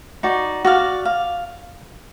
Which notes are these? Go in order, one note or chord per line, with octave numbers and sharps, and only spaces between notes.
D#4 F#4 D5
F#4 D5 F5
F5